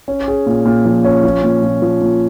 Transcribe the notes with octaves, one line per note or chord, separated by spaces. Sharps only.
C#4
G#4
A#2
A#2
F3
C#4
F3
A#2
A#2
F3
A#2